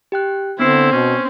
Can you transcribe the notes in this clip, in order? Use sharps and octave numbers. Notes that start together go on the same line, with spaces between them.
G4 G5 F#6
D3 B3 C4 D4 E4 C7
B2 C#4